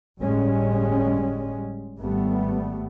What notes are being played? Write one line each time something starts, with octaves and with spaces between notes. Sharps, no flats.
G1 A2 G3 G#3 C#4
G#1 G3 A3 B3